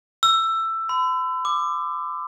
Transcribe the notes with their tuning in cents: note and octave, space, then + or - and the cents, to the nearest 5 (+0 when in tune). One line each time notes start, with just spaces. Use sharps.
E6 +15
B5 +45
D6 +20